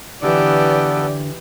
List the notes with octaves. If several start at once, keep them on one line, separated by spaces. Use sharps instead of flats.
D3 E3 B3 G4 A4 D5